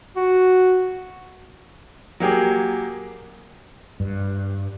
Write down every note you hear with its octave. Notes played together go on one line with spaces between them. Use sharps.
F#4
F#3 A#3 G4 G#4
G2